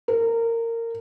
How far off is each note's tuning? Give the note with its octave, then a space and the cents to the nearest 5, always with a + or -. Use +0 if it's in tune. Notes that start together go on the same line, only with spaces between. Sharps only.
A#4 -20